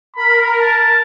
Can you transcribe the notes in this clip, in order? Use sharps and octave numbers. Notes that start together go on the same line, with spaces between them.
A#4 B5
A5